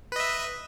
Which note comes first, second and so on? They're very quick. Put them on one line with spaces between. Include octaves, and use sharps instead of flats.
B4 D#5 E5